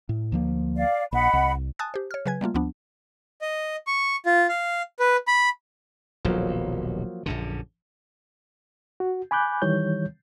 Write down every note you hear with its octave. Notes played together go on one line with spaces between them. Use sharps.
A2
D2 F3 A#3
D5 F5
A#1 D#5 F#5 B5
C2
G#5 A5 D#6 F#6 A6
G4 C5
C#5 F6
C#3 F#3 B4 G#5 G#6
G3 A3 A#3 F4
D2 F3 B3 D4
D#5
C#6
F4
F5
B4
B5
D#1 B1 F3 F#3 A#3
A#1 F#2 D3
F#4
G#5 B5 D6 F#6 G6
D#3 E3 G3 C#5 G6